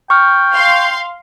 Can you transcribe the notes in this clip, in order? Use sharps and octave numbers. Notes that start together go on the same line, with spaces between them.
G5 C#6 F6
F5 C6